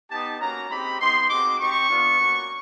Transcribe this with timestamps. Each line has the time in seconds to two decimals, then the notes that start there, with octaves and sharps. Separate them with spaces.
0.10 B3 D#4 G4 A5
0.40 A#3 C#4 F#4 A#5
0.69 G#3 C4 D#4 G4 B5
1.00 B3 D#4 G4 C6
1.29 G#3 C4 D#4 F#4 D6
1.59 C4 D#4 G4 C#6
1.89 B3 D4 F4
2.19 A#3 C#4 F#4